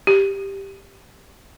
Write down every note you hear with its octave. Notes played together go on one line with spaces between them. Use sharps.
G4